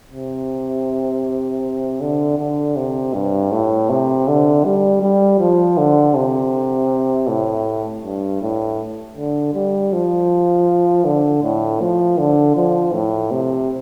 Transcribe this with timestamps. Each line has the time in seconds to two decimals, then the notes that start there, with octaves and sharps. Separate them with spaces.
0.12 C3
2.01 D3
2.39 D3
2.76 C3
3.14 G2
3.52 A2
3.90 C3
4.28 D3
4.65 G3
5.02 G3
5.40 F3
5.78 D3
6.16 C3
7.29 A2
8.04 G2
8.42 A2
9.17 D3
9.55 G3
9.93 F3
11.05 D3
11.43 A2
11.81 F3
12.18 D3
12.57 F3
12.94 A2
13.31 C3